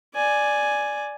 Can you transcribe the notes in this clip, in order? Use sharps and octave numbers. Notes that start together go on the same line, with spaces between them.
D5 G#5